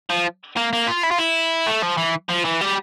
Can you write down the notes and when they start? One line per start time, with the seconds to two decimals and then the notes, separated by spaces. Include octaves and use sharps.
0.10 F3
0.57 A#3
0.73 A#3
0.88 F4
1.03 E4
1.11 F4
1.18 E4
1.67 A3
1.82 F3
1.97 E3
2.29 F3
2.44 E3
2.61 G3